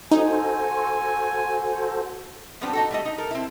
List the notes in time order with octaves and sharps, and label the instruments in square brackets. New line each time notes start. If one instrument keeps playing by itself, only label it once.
[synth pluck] D#4 [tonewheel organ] F#4 A4 C5 [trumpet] G#5
[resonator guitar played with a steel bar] F3 G3 B3 C4 D4
D#4 F#4 A4
G3 A3 D#5
D#4
A4 A#4
C4 E4